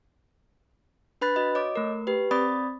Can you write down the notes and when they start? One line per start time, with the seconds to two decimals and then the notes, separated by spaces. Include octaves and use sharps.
1.21 D4 B4 B5 F#6 A6
1.36 F#4 D#5
1.55 C#5 D#5 D6
1.76 A3 A#4
2.07 G4 B4
2.31 C4 D5 B5 D#6 A6